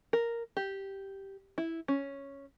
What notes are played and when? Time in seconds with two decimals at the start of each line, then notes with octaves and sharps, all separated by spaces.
0.13 A#4
0.57 G4
1.58 E4
1.88 C#4